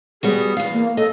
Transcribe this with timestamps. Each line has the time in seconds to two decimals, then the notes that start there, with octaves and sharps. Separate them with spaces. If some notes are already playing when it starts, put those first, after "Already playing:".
0.23 G3 B3 F#4 G#4
0.57 E2 F5
0.72 A#3
0.97 A4 D#5